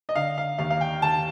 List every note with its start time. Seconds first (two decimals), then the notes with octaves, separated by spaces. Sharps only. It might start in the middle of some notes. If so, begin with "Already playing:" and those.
0.09 D#5
0.15 D3 F5
0.38 F5
0.59 D#2 F5
0.70 F5
0.81 G5
1.02 D#2 A5